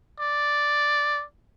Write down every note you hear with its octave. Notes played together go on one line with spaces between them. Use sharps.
D5